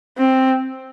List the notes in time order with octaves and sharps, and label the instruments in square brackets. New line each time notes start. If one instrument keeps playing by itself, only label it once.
[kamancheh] C4